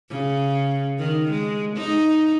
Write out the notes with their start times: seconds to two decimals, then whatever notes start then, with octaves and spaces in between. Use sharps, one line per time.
0.10 C#3
0.99 D#3
1.31 G#3
1.77 D#4